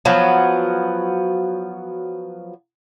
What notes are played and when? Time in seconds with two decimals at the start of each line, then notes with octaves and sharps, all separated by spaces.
0.05 F3 F#3 B3